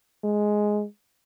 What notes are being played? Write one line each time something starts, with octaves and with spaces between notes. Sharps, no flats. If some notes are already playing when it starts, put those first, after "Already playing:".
G#3